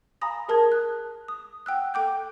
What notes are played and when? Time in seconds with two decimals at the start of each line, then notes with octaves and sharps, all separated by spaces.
0.21 F5 G#5 A#5 B5 D#6 A#6
0.48 G#4 A#4 A5 D#6 G#6
0.72 F#6
1.28 D#6
1.66 F#5 G5 E6 F#6
1.94 A4 G5 D6 G6